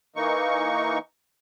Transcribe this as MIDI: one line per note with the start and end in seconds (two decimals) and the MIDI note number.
0.16 0.98 52
0.16 0.98 58
0.16 0.98 63
0.16 0.98 85